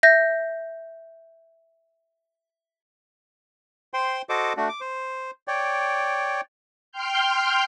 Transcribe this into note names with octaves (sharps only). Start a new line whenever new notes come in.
E5 G6 A#6
C5 G5 C6
F#4 A4 C5 D#5 D6
A3 D4 F#4
D6
C5
C#5 D5 G5
G5 C6 F6 G6